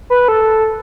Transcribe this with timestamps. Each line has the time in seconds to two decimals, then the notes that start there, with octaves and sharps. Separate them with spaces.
0.10 B4
0.28 A4